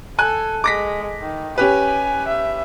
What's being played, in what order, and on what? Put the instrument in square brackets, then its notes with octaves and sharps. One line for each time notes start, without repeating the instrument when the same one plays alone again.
[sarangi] A4 [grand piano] G#5 F#6
[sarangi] G#3 [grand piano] D6 A#6 B6
[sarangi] D#3
[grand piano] C#4 G4 B4 [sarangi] G#5
[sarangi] E5